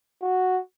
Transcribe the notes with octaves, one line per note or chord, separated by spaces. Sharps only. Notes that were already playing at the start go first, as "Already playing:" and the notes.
F#4